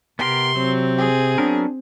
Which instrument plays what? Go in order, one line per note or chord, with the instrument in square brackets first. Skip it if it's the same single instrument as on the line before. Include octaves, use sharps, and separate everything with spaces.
[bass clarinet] C3 [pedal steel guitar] B3 G4 A#4 [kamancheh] C6
[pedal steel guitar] F#3 [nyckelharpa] C4
[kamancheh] G#4
[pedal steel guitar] F#3 B3 A#4 [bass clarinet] D4